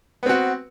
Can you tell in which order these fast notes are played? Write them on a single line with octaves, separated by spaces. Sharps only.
B3 C4 F#4